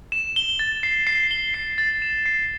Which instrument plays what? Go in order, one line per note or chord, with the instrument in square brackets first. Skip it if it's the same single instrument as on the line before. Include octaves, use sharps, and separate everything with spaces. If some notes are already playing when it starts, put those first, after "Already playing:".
[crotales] E7
G7
A6
C7
C7
G7
C7
A6
E7
C7